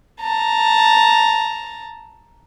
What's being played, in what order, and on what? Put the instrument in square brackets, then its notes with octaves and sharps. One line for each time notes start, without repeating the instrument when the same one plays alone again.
[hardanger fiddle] A5 A#5